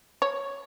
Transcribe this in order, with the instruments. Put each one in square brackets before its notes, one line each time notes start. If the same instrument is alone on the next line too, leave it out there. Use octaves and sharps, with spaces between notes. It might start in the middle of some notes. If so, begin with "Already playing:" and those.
[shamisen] C#5